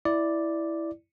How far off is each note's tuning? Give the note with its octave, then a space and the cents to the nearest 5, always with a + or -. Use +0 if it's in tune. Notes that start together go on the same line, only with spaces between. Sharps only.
E4 +0 D5 +0